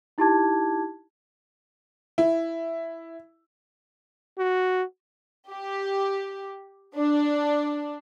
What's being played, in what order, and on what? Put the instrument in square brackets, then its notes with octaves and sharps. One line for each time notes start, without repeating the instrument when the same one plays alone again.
[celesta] D#4 E4 G4 A5 D6 G#6
[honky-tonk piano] E4
[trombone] F#4
[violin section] G4
D4